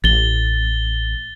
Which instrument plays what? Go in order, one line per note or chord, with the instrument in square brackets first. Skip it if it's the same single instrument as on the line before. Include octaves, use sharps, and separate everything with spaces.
[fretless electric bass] A1 [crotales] A6 G7